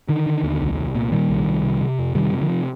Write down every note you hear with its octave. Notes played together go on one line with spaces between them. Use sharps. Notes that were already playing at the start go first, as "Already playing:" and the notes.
D3 D#3
D3
D#2
C2
C2
A#2
A#2 D#3 G3
C2
C2
C3
C3
F2
C3 D#3 G3
C3
D3 F3
C3